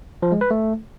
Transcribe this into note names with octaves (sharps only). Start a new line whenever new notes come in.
F3
G#3
B4
A3